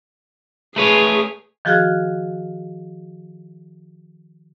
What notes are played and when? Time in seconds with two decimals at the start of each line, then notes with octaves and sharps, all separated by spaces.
0.76 A3 G#4 B4 C#5
1.65 D#3 F3 F#4 G#4 F6 F#6